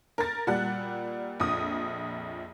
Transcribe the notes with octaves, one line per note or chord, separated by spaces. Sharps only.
A#4 A6
A#2 G3 F#5 F#6
A#1 F2 D#6